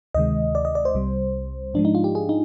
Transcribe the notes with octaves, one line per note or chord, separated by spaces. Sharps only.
D2 C3 D#3 G#3 D#5
D5
D#5
D5
C5
C2 C3 G3
G#2 F3 G#3 D4
D#4
F4
G4
G#4
D#4